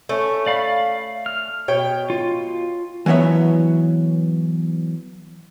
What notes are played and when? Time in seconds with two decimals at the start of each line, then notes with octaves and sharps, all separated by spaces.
0.09 A3 C#4
0.47 D5 F5 B5
1.26 F6
1.68 B2 C#5 G5
2.10 F4
3.06 E3 F#3 B3 C#5 E5